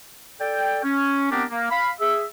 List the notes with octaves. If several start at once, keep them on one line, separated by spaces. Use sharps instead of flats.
A4 D5 G5
C#4
B3 C4 D4 G4 A#4
A#3
F5 B5
G#4 E5